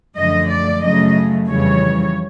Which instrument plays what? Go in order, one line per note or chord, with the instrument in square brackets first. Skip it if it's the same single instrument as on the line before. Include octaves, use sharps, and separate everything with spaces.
[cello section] F#2 D3 F3 A3 D#5
D5
F#2 C#3 F#3 A3 D#5
F2 C#3 E3 G3 C#5